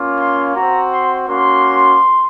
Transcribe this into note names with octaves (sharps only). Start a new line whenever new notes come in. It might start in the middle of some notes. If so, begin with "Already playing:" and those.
Already playing: A#3 C#4 F4
C6
C4 F#4 A#5
C6
A#3 C#4 F#4 C6